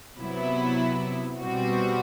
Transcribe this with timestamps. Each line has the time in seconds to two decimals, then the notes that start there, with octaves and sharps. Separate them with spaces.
0.18 C3 F#3 B3 E4
1.41 B2 G3 C4 F#4